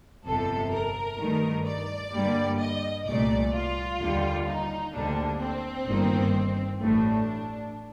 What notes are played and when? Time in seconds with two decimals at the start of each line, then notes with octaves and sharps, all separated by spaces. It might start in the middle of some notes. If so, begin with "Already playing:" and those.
0.24 G1 F2 C3 A4
0.72 A#4
1.18 G2 D#3 A3
1.65 D5
2.12 G2 D3 G3 A#3
2.58 D#5
3.05 C2 A#2 A3 D5
3.52 F4
3.99 D#2 D3 G3
4.45 D#4
4.92 D2 D3 G3 A#3 D4
5.39 C4
5.86 G1 G2 D#3 A#3
6.79 A1 A2 A3 D4